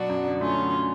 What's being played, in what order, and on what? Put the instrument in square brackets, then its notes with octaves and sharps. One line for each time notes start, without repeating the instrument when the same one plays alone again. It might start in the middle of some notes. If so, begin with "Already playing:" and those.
Already playing: [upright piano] B2 F#3 [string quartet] D4 F#4
[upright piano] F#2
D3
[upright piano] A3 [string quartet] C#4 F4
[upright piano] F#3